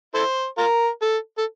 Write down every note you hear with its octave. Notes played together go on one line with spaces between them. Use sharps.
E4 A4 C5
F4 A#4
A4
A4